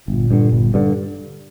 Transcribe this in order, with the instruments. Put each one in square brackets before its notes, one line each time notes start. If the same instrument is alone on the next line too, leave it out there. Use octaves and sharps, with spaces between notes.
[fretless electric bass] G1 [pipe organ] A#2
[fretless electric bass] G2 D3
G1
G2 D3